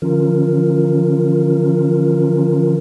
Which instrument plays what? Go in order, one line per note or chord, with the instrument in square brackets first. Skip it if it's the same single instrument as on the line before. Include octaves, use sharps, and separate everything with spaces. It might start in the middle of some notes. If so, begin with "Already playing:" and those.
[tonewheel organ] D3 E3 F3 C#4 F4 A#4